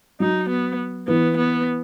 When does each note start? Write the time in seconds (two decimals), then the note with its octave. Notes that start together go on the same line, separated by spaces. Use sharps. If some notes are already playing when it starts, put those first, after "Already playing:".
0.20 F#3 D#4
0.49 B3
1.08 E3 B3
1.37 B3